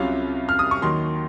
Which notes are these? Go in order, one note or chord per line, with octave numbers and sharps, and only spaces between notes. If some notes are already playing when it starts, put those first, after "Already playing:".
Already playing: C2 C3 F#3 C#4 F4 F5
F6
D#6
C#6
D#2 D#3 F#3 C6